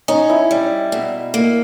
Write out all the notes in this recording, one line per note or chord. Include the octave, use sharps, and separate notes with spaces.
C#4 D#4
E4
G3
B2
A#3